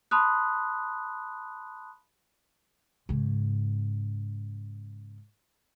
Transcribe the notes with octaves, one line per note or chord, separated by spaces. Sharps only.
A5 B5 C6 D#6 F#6
G#2 C#3